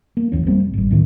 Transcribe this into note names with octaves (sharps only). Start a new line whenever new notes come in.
A#3
F#1 E2 C#4
G3 G#3 A#3 C4
F1
G#1 G2
B1 A2 D#3